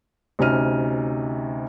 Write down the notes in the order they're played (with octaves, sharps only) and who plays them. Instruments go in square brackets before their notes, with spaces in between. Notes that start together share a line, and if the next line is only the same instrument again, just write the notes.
[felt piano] D2 C3 C#4 D#4 F6 D#7